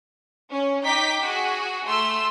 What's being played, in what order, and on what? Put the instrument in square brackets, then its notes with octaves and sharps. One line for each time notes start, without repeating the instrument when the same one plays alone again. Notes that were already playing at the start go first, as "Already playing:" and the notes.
[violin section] C#4
D#4 G5 D6 B6
F#4 G#4
A3 C6 E6